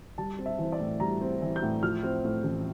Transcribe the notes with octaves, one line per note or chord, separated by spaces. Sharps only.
G3 A5
C4
E5
E3 C5
D5
A2
G3 A#5
C4
E3
G6
A2
F3 F6
C4
A2
A1